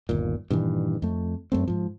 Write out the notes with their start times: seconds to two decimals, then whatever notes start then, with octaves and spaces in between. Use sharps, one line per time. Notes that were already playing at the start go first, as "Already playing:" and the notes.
0.09 G1 D#2 A#2
0.51 G2 A#2 D#3 E3
1.02 F2 A3
1.52 F#2 A3 C4
1.68 G#2 F3